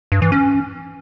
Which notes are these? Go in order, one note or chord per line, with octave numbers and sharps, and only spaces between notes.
G2
E3
C#4